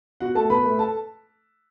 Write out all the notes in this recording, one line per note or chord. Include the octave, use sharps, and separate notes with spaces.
B2 F#4 F#5
A3 A4 A5
B2 B4 B5
A3
A4 A5